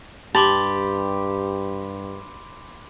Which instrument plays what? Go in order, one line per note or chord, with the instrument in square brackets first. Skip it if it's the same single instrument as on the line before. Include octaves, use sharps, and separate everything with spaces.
[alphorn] G2 [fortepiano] G4 [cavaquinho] A5 [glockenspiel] B5 C6 D6